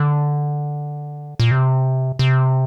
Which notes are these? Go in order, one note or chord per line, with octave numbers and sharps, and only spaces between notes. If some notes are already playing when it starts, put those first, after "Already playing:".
Already playing: D3
A#2
C3
C3